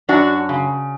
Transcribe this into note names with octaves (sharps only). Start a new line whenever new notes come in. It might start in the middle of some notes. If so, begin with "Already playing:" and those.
F#2 D4 F#4
C#3